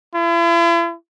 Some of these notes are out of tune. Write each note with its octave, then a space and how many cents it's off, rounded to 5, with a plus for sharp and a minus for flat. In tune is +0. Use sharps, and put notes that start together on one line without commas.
E4 +45